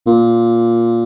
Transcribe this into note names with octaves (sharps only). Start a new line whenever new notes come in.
A#2